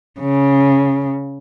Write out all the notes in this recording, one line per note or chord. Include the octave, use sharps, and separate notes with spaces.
C#3